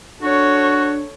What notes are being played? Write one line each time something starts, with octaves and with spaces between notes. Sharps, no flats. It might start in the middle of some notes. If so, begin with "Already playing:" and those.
D4 F#4 A4 C#5